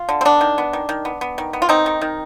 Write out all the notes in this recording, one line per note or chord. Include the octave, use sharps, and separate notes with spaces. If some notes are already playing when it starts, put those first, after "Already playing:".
Already playing: F4
D3
C4
B3 D4
D#3
B3
D#3
D#3
B3
B3
D#3
B3
F4
D#3 C4 D#4
D#3
D#3